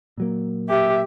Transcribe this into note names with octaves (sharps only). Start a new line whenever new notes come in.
A#2 F#3 A#3
G4 E5